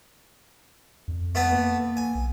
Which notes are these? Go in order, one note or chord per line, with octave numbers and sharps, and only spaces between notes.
F2
A3 B3 B4
A#3
G#5
B1